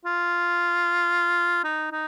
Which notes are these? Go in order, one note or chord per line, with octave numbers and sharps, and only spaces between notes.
F4
D#4
D#4